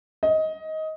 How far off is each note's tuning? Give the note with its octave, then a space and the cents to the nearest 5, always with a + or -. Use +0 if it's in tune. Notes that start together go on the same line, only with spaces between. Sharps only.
D#5 +15